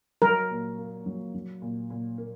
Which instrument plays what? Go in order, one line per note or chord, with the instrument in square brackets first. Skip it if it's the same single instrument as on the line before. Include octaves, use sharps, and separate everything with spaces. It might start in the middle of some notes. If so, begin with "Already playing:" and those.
[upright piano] F#3 [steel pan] A#4
[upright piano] A#2
A#3
F#3
F#3
A#2
A#2
A#3